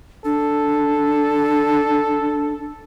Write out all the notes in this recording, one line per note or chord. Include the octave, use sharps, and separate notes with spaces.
D4 A4